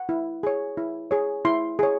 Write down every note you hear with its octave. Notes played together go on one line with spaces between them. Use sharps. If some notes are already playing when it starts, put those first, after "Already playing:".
Already playing: F#5
E4
G#4 C#5
E4
G#4 C#5
E4 C6
G#4 C#5